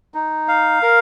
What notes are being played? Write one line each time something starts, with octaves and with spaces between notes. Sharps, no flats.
D#4
F5
A#4